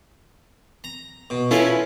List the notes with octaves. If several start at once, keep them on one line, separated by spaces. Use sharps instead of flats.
A#5
B2
C#4 E4 F4 A4 B4 G#5